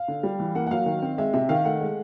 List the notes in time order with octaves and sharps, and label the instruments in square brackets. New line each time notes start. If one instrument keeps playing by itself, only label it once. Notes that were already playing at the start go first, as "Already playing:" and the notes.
Already playing: [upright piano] F5
D3
G3
E3
A#3 F#5
F#5
F#3 F5
D#3
C4
G#3 E5
C3 E5
D#3 F5
A3 F#5
G#3